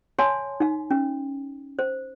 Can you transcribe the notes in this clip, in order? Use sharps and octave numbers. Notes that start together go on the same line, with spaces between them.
C#5 F5 G#5 A5 C6
D#4 F5
C#4
C5